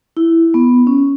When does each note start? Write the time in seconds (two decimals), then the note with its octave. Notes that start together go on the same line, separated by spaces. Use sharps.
0.17 E4
0.54 B3
0.87 C#4